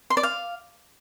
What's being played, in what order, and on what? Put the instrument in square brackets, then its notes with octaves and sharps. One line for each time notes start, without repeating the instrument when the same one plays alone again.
[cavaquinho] C6
D5
F5